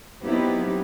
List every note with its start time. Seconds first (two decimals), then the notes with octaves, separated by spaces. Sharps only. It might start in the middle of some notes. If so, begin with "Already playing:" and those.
0.24 F#3 B3 C4 D#4 E4 G4